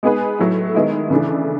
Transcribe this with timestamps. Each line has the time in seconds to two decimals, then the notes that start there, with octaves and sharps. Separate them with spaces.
0.03 G#3 B3 D#4 G#4 B4
0.39 A2 F#3 A3
0.75 D#3 G#3 B3 E4
1.10 C#3 E3 A3 D4